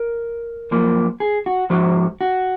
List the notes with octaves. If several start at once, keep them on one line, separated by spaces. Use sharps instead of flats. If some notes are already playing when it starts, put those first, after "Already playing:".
Already playing: A#4
F#2 F3 A#3
G#4
F#4
G#2 F3 F#4
F#4